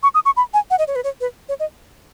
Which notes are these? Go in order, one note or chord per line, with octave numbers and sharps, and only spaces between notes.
C#6
D#6
C#6
B5
G#5
F#5
D#5
C#5
B4
C#5
B4
C#5
D#5